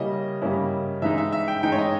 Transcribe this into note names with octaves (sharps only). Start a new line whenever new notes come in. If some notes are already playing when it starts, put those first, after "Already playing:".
Already playing: C#3 G3 A#3 C#4 E4 D#5
C#3 G3 A#3 C#4 E4
E3 G#3 D#4 E5
E5
E5
G5
E3 G#3 D#4 G5
C#5
D#5